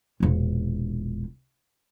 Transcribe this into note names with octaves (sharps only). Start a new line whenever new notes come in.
E1 A#1